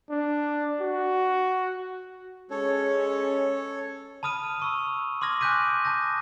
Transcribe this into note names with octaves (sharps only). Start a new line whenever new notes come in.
D4
F#4
G#3 C#4 A4 C#5
A5 B5 D#6 F6 D#7
B5 C#6 E6
C6 D6 D#6 F6 G#6 A#6
G#5 D6 F#6 G6 B6 D#7
A5 D#6 G6 A#6